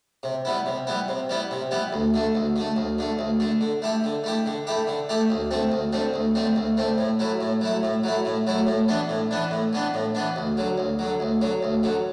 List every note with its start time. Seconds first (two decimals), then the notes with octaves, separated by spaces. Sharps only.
0.23 C3
0.45 G3 B3 E4
0.66 C3
0.87 G3 B3 E4
1.08 C3
1.29 G3 B3 E4
1.51 C3
1.71 G3 B3 E4
1.93 D2
2.14 D3 A3
2.35 D2
2.56 D3 A3
2.76 D2
2.98 D3 A3
3.19 D2
3.40 D3 A3
3.61 D3
3.82 A3 E4 G4
4.04 D3
4.24 A3 E4 G4
4.46 D3
4.67 A3 E4 G4
4.87 D3
5.09 A3 E4 G4
5.30 D2
5.51 D3 A3 C4
5.72 D2
5.93 D3 A3 C4
6.14 D2
6.35 D3 A3 C4
6.56 D2
6.77 D3 A3 C4
6.98 A2
7.19 F#3 A3 E4
7.41 A2
7.61 F#3 A3 E4
7.83 A2
8.04 F#3 A3 E4
8.25 A2
8.47 F#3 A3 E4
8.67 A2
8.88 E3 B3 D4
9.09 A2
9.31 E3 B3 D4
9.51 A2
9.73 E3 B3 D4
9.94 A2
10.15 E3 B3 D4
10.36 D2
10.57 D3 F#3
10.78 D2
10.99 D3 F#3
11.20 D2
11.41 D3 F#3
11.63 D2
11.83 D3 F#3